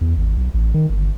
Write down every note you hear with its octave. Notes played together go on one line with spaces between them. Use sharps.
E2
G#1
B1
A1
D#3
G1